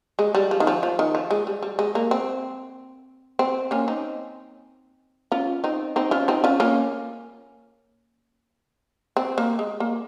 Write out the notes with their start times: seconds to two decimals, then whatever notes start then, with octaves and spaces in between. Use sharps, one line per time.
0.19 G#3
0.35 G3
0.51 F3
0.60 D#3
0.67 F3
0.83 F3
0.99 D#3
1.15 F3
1.31 G#3
1.47 G3
1.63 G3
1.79 G#3
1.95 A#3
2.11 C4
3.39 C4
3.71 A#3 C#4
3.88 C4 D#4
5.32 C#4 F4
5.64 C4 D#4
5.96 C4 D#4
6.11 C#4 F4
6.28 C4 D#4
6.44 C#4 F4
6.60 A#3 C#4
9.17 C4
9.38 A#3
9.59 G#3
9.80 A#3